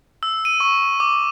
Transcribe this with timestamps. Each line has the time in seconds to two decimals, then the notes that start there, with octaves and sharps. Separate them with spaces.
0.23 E6
0.45 D#7
0.60 C#6
1.00 D6